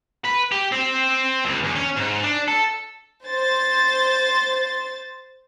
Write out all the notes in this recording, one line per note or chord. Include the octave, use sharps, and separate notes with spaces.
B4
G4
C4
C#2
E2
C#4
G#2
D4
A4
C5 A6